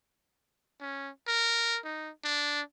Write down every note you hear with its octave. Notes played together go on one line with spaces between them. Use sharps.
C#4
A#4
D#4
D4